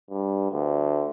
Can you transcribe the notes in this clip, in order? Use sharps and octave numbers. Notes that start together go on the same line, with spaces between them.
G2
D2